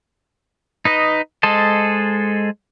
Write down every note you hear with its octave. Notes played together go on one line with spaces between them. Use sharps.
D#4 B4 D#5
G#3 A4 C5 D#5 A5